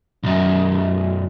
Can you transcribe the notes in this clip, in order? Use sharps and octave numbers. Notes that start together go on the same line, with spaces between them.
B1 F#2